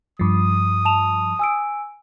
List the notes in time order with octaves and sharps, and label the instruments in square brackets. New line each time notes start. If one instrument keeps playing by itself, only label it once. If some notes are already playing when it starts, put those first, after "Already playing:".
[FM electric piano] G2 F3 [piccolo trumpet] D#6
[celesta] A5 E7 F7
G#5 E6 D7